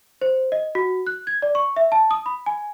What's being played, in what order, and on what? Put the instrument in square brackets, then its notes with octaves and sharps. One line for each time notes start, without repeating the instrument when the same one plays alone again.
[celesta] C5
D#5
F#4
F#6
G#6
D5
C#6
E5
A5
D#6
B5
G#5